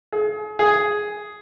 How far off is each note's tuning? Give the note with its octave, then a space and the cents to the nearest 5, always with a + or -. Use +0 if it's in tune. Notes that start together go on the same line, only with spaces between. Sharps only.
G#4 +35
G#4 +5